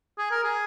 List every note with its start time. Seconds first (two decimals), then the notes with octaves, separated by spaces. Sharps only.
0.18 G#4
0.31 A#4
0.44 G#4